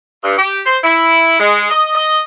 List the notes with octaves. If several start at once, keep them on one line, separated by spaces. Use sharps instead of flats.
G2
G4
C5
E4
G#3
D#5
D#5